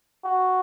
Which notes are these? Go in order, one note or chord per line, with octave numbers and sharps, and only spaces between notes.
F#4